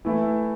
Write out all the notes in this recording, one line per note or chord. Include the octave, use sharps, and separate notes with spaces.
E3 A3 E4